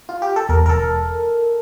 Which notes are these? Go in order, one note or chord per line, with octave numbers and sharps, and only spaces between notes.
F4
G4
A4
E2 A#4
A#4
E1 A4